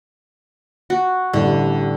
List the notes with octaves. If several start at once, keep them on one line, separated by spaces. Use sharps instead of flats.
F#4
A1 D3 G3